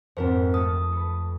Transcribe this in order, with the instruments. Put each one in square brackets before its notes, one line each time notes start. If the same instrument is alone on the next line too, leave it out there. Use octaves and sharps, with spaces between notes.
[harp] G#1 F2 [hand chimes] C4 A#4 C5
[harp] A3 F4 [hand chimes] D#6
[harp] A4 B4